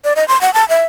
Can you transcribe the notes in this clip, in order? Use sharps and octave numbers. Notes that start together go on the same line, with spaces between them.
D5
D#5
C6
F#5
A5
E5